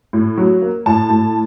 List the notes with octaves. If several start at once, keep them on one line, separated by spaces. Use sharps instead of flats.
A2
F#3
A#3
A2 A5
A2